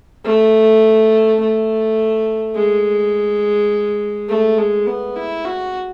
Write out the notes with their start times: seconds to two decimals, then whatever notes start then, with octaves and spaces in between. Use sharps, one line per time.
0.24 A3
1.40 A3
2.56 G#3
4.28 A3
4.58 G#3
4.87 B3
5.16 E4
5.45 F#4